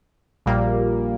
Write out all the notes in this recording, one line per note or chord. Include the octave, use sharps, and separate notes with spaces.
A#1 A#2 G3 A#3